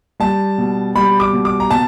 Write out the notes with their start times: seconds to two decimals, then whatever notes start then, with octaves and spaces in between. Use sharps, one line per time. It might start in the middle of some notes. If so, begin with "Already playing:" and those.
0.20 G3 A5
0.58 B2
0.95 G3 B5
1.20 D6
1.33 B2
1.45 D6
1.60 A#5
1.70 B2 A5